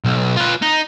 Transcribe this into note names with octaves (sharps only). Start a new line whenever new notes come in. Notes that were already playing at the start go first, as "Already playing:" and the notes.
B1
F4 B4
D#4